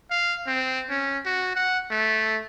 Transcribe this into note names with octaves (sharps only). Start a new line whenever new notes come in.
F5
C4
C#4
F#4
F#5
A3